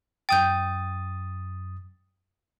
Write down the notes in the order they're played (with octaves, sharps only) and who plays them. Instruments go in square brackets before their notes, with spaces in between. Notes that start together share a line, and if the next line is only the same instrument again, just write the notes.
[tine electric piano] F#2 D#6 A6 [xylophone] G5 G6